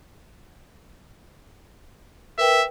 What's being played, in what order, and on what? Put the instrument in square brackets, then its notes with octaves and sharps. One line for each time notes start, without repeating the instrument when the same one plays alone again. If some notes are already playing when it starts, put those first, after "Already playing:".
[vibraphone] A#4 B4 G5 [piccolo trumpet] E5